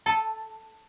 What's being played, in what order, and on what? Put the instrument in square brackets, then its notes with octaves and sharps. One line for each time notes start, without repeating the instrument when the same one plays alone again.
[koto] A4 [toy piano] A5